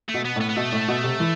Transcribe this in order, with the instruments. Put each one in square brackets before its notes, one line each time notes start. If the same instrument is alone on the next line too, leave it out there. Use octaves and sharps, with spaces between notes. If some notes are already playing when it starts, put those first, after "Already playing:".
[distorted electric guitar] A3
[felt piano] B2
[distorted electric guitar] B3
[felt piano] A2 [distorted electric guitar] B3
[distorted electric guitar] B3
[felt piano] B2 [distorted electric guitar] A3
[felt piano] A2
B2
C3
E3